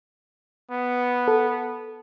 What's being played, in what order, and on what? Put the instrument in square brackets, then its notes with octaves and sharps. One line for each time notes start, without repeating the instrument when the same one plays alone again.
[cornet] B3
[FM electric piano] A4